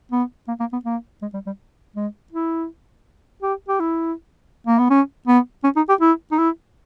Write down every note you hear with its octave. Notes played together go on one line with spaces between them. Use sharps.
B3
A#3
A#3
B3
A#3
G#3
G3
G3
G#3
E4
G4
G4
E4
A#3
B3
C#4
B3
C#4
D#4
G4
E4
D#4
E4